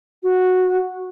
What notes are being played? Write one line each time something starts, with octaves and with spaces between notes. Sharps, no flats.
F#4